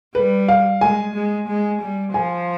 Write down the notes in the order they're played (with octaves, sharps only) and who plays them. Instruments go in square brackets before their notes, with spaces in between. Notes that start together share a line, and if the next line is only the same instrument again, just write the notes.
[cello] G3 [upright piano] B4
[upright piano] F5
[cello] G#3 [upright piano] G#5
[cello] G#3
G#3
G3
[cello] F3 [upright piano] G#5